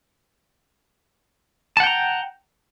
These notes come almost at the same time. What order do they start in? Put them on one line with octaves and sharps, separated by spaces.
A5 F#5 G5 A#5